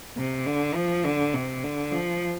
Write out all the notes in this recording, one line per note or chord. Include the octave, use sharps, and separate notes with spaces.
C3
D3
F3
D3
C3
D3
F3